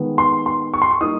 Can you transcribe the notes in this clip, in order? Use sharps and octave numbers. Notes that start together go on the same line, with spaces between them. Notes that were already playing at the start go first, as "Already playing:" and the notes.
Already playing: D#3 G#3 B3
C6
C6
C#6
C6
C#6
G3 A#3 D#4 D#6